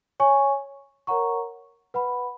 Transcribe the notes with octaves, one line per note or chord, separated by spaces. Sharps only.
C#5 G#5 C#6
A#4 C#5 F#5 A#5 C#6
B4 F#5 B5